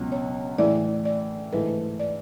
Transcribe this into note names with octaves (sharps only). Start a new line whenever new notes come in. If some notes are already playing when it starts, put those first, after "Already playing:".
Already playing: C#2 B2 F#3
C#5
A2 E3 G#3 D5
D5
G#2 E3 A3 B4
D5